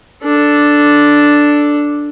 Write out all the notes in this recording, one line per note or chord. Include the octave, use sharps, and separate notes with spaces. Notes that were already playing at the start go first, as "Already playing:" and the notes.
D4 A4